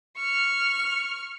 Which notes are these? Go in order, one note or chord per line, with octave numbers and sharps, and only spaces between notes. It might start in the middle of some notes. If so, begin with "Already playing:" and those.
C#6 F6